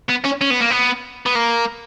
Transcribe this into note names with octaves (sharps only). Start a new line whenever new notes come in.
B3
C#4
C#4
B3
A#3
B3
B3
A#3